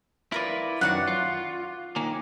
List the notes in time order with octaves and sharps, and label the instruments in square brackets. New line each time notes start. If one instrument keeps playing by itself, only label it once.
[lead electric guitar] E4 B4 [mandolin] F4 A#4 D5
[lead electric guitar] F#2 D#3 [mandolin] F#4 D5 F#5
[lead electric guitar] F4
[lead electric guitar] D#3 A#3 [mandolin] G#5